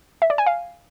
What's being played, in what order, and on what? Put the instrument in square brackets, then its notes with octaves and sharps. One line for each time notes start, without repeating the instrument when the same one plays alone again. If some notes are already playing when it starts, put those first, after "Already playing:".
[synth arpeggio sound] E5
D5
G#5
F5